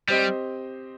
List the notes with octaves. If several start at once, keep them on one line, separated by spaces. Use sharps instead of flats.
G3 C4 G4 C5 D#5